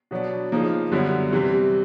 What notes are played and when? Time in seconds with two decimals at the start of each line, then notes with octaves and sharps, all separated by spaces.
0.11 B2 F#3 B3 D4
0.52 C#3 F3 A#3 D#4
0.92 F#2 D3 G3 B3 E4
1.33 C3 E3 G3